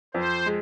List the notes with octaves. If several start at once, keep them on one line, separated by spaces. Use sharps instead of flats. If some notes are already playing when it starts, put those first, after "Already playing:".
F2 C5
G#3